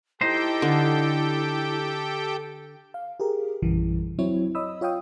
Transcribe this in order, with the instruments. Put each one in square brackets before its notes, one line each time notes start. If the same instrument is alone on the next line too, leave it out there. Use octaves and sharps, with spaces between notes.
[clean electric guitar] D#4 C5 [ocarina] E4 [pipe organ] G4 A4 G5
[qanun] D3
[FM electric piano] F5
G4 G#4 A#4
A#1 F#2 C#3 E3 G3
F#3 C4 E4 C#5
C#5 D#5 B5 D#6 E6
F4 C#5 F5 G5 D#6